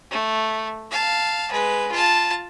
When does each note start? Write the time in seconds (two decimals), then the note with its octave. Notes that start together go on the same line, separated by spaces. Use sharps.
0.11 A3
0.91 F5 A5
1.51 G#3 B4
1.91 F4 A5